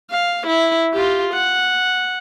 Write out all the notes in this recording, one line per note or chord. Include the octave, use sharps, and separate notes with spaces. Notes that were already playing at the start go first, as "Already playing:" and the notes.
F5
E4
F4 G4
F#5